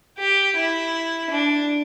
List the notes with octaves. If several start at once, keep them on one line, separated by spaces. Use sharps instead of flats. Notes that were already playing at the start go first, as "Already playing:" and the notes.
G4
E4
D4